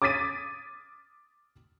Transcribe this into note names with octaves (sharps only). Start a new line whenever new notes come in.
D6 D#6 G#6 A6 B6 D#7